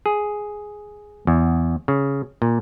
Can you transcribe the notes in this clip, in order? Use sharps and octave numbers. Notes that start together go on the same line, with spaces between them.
G#4
E2
C#3
A#2